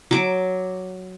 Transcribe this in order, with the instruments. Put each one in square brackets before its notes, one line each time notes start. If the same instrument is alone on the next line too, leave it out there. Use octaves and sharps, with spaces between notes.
[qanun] F#3 D6